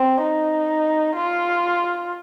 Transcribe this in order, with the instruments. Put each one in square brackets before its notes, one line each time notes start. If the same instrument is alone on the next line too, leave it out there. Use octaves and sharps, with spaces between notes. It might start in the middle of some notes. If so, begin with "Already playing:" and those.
Already playing: [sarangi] C4
D#4
F4